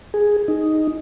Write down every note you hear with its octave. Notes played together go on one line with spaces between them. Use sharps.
G#4
D#4